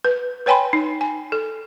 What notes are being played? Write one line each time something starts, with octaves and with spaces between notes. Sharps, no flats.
B4
B4 C#5 G5 G#5 B5 C6
D#4
G#5
A4